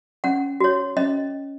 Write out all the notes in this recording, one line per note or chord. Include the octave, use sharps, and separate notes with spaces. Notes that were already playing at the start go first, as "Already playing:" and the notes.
C#4 F#5
F#4 C#5
C#4 D#5